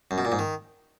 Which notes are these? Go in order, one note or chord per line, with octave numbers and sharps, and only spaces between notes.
F#2
B2
A#2
G#2
D#3